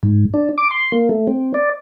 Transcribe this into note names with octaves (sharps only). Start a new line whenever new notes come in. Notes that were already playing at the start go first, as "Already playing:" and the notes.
G#2
D4
D6
C6
A#3
A3
C4
D5